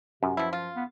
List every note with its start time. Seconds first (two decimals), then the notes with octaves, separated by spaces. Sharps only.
0.23 F#2 C3
0.37 B2 F3 E4
0.53 F4
0.76 B3